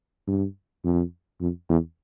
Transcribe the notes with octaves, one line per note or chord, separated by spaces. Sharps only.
G2
F2
F2
E2